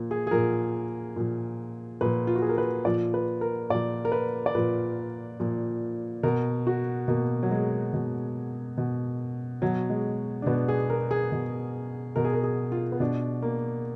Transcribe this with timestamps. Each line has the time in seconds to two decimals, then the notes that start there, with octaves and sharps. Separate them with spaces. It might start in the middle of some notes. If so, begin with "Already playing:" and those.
Already playing: A#2 F3
0.11 G#4
0.27 G#4
0.31 A#2 F3 A#4
1.16 A#2 F3
2.01 A#2 F3 B4
2.27 F4
2.35 F#4
2.42 G#4
2.49 A#4
2.58 B4
2.85 A#2 F3 D5
3.14 B4
3.41 A#4
3.70 A#2 F3 D5
4.05 A#4
4.12 B4
4.46 D5
4.55 A#2 F3 B4
5.40 A#2 F3
6.23 B2 A#4
6.67 F#4
7.08 B2 A#3
7.43 F#3
7.51 G#3
7.94 B2
8.77 B2
9.62 B2 F#3
9.90 G#3
10.42 D4
10.46 B2 B3
10.68 G#4
10.90 A#4
11.11 G#4
11.32 B2
12.16 B2 A#4
12.24 G#4
12.33 A#4
12.44 G#4
12.72 F4
12.92 B3
13.00 B2 D4
13.43 A#3